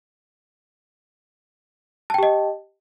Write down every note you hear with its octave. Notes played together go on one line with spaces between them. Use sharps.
G4 D#5 G5 A5